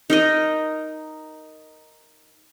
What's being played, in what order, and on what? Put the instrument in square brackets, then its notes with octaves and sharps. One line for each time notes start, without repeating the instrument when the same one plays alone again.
[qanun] D#4 A#4 D#5